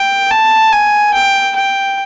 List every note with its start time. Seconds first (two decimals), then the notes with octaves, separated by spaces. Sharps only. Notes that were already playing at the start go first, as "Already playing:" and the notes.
Already playing: G5
0.31 A5
0.72 G#5
1.14 G5
1.56 G5